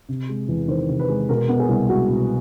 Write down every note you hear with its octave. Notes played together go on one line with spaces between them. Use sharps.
C3
G#3
E2
D#3 C5
C3
B4
G#3
B2 A#4
B3
G#4
C2
G#3 F#4
B2